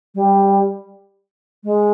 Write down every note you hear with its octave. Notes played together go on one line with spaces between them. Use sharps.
G3
G#3